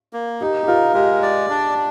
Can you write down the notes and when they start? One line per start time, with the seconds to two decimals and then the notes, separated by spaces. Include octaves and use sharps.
0.13 A#3
0.41 D#4 G4
0.63 G4
0.68 F4 A#4
0.94 G#3 G4
1.23 D5
1.50 D4